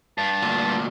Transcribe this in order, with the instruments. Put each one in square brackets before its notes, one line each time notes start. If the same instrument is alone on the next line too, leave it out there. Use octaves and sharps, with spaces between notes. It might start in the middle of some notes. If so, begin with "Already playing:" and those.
[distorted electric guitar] G2 [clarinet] A5
[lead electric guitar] D2 A#2